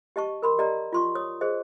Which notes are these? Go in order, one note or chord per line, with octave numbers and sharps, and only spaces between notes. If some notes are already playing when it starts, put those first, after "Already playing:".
G4 D#5 A5 C#6
A#4 B5 C6
G4 D5 D#5 A#5
F4 C6 C#6
C#5 D#6
G#4 C5 D#5